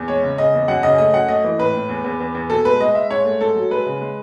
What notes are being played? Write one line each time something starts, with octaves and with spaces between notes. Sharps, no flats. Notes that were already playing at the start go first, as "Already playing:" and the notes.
Already playing: E2
G#3 C#5
C#3
C#3 D#5
E2
F#2 F#5
C#3 D#5
A3 D#5
F#2 F#5
A3 D#5
E3
A2 B4
A2
E2
E2
E2
E2
B2 A4
G#3 B4
G#3 D#5
G#3 E5
G#2 C#5
A3
G#2 A4
F#3
G#3 B4
C#3
G#3